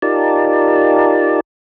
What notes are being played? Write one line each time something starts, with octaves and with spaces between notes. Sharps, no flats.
D#4 F4 G4 A#4 D5 A5